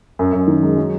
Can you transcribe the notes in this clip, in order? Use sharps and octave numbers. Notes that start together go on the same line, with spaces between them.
F#2
F#2
D#3
G#3
F#3